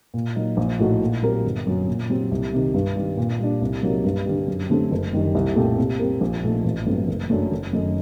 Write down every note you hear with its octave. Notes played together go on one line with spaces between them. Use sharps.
A#2
F#3 A#3 D#4
A#1
A2 A3 D#4 F#4
A#2
F#3 C4 G4 A#4
G1
F#2 F#3
A#2
F#3 C4 G4
C2
C3 D#3
G2
D#3 G3
A#2
G3 D4
C2
C3 F#3 A#3 D#4
G2
D3 G3
F#2
D3 A3 C4 G4
F#1
F#2 D#3 G3
C2
A#2 A3 C4 G4
C3
G3 C4 G4 A#4
A#1
A#2 A3 D#4
A1
G2 F#3 A3 C4
F#1
F#2 F#3 A3 D4
F#1
F#2 D#3 A3 D#4